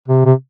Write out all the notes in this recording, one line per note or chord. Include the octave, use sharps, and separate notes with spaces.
C3
C3